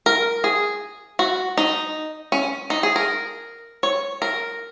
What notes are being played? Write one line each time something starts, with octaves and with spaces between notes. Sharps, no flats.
A#4
G#4
F#4
D#4
C#4
D#4
G#4
A#4
C#5
A#4